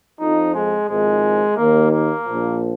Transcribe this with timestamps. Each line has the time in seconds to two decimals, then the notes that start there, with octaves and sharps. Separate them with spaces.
0.20 F2 F3 D#4
0.55 G#3
0.89 G#1 G#2 F3 G#3
1.57 D#2 D#3 A#3
1.91 A#3
2.25 A#1 A#2 F3